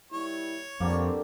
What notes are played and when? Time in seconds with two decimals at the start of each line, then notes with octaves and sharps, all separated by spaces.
0.12 G3 A#3 E4 C#5
0.80 F2 D3 F3 G3 A#3 C4